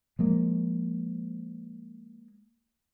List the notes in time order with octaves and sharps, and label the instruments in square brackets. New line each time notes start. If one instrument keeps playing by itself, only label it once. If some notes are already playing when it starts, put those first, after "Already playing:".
[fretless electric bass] F3 G#3 A#3